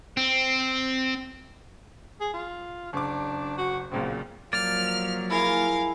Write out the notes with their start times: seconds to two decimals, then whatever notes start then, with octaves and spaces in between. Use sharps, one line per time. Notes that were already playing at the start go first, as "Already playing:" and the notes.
0.17 C4
2.21 G#4
2.34 F4
2.93 F#1 D4 D6
3.58 F#4
3.91 B1 A#2 C#3 C4
4.53 F3 F#3 A#3 D5 F6
5.30 E4 G#4 A#4 F5